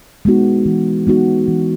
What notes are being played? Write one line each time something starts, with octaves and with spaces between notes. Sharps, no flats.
G#3 B3 D#4 F#4
E3
G#3 B3 D#4 F#4
E3